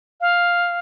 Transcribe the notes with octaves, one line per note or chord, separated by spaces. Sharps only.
F5